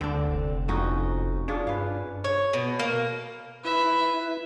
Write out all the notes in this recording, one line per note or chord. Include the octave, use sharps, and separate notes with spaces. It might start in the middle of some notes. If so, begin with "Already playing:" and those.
D2 D3 C4 D4
F1
F2 C#4 D#4 F#4
D4 F4 G#4 C#5
G2 B4 F5
C#5
B2
A#3
E4 B4 E5